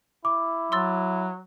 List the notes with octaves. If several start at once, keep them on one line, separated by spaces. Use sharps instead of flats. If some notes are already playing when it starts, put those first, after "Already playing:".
E4 D6
F#3 C6 E6 A6